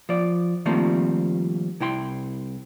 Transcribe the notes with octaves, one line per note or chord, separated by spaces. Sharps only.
F3 D5
D#3 F3 G3 A3 A#3 C4
C2 E4 G5 C6